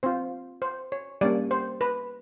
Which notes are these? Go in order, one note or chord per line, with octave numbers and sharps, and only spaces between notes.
C4 F4 C5
C5
C#5
G3 A#3 C#4 D5
C5
B4